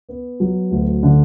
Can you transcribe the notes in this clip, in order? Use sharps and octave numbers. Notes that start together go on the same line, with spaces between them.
B3
F#3
D2
D3